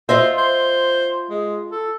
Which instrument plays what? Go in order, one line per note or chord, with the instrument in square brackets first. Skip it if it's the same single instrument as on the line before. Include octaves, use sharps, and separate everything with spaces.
[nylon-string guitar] F4 D#5 E5 [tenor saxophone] C5
[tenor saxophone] C5
G#3
A4